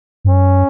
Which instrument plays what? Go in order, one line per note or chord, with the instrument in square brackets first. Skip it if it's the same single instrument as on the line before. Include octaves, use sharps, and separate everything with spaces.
[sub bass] G2
[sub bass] F#2 [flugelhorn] C#4